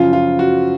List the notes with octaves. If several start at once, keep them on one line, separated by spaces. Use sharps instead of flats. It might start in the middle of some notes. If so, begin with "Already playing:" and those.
Already playing: F#2 C#3 F3 F4
F4
F#4